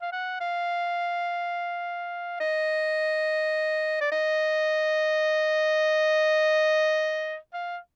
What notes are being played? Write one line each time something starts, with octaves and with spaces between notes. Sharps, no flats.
F5
F#5
F5
D#5
D5
D#5
F5